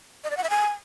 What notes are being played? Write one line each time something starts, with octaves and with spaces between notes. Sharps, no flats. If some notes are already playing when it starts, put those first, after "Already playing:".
D#5
D5
F#5
E5
G#5